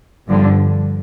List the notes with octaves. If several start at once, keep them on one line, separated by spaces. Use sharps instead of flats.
G1 G2 D3 F3